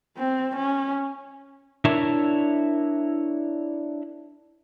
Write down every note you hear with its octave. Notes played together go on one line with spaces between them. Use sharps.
C4
C#4
D4 E4 A#4 C#5 D5 E5